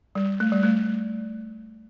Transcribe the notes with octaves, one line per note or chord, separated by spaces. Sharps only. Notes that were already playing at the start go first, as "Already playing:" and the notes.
G3
A3
G3
A3